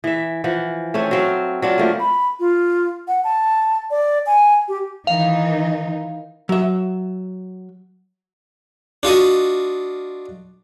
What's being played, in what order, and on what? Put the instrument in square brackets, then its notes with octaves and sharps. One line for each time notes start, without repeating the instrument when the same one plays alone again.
[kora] E3 E5
E3 F3 F#5
A3 C4 C#4
F#3 C4 F5
F#3 D4 F4
F3 A3 A#3
[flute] B5
F4
F#5
A5
D5
G#5
G4
[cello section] D#3 E3 D#4 [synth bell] F5
[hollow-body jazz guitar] F#3 E5
[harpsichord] D4 F4 F#4 D#5